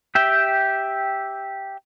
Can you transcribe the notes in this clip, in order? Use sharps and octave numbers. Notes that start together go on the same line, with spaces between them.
G4 E5 G5